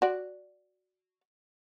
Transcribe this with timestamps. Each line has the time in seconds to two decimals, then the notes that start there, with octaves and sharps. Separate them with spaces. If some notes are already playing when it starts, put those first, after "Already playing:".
0.02 F#4 D5